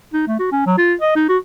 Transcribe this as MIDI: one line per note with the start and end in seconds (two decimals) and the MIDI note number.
0.14 0.23 63
0.27 0.37 57
0.39 0.48 66
0.52 0.66 61
0.67 0.77 54
0.78 0.94 65
1.01 1.14 75
1.16 1.25 63
1.29 1.38 66